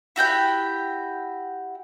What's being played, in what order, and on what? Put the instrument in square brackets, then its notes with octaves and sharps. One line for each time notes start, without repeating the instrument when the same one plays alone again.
[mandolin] E4 F#4 G4 G5